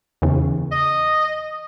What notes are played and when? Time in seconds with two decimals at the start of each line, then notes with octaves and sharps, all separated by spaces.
0.22 E2 C#3
0.72 D#5